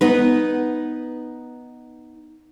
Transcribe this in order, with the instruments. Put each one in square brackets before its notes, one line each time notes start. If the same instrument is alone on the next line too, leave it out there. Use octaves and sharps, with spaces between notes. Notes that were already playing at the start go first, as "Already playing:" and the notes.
[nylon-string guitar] B3 D#4 B4